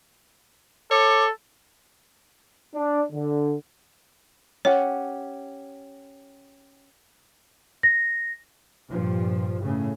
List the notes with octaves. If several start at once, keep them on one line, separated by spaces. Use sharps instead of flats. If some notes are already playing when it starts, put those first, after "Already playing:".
A4 C#5 D6
D4
D3
C#4 G4 C#5 F#5
A#6
G2 A#2 F3
A2 C#3